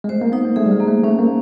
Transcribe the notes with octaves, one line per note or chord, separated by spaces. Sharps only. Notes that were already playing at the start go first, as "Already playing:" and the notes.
G#3
A3 C5
A#3
B3 D#4
A#3
A3 G#4
G3
G#3
A#3
A3
A3 C#4
A#3